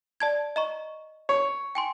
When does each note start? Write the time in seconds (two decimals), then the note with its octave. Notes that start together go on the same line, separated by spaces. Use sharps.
0.20 D5 A5 G#6
0.56 D#5 A#5 C#6
1.29 C#5
1.75 G5 G#5 C6